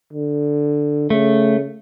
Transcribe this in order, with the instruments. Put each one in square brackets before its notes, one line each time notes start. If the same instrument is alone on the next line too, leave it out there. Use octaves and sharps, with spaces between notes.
[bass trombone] D3
[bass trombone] C#3 [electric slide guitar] A3